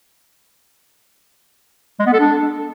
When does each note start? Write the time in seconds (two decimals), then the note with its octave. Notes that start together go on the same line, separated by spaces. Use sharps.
2.00 G#3
2.06 B3
2.13 A4
2.20 D4